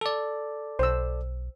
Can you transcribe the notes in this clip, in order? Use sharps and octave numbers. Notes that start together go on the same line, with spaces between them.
A4 D5
B1 C5 E6